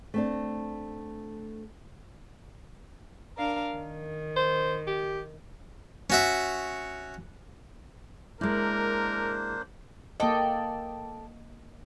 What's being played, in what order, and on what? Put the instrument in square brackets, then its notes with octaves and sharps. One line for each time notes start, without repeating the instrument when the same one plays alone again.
[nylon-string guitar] A3 C4 D4
[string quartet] D4 A#4 F5
D#3
[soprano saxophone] C5
G4
[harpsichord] C#4 F#4 E5
[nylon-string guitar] G#3 E4 [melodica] A#3 D4 C5 [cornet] A#4
[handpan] A#3 D#5 [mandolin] A4 D5 G5